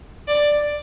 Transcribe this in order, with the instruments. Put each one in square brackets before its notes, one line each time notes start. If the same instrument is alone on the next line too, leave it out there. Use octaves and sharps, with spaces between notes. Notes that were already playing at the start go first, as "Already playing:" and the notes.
[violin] D5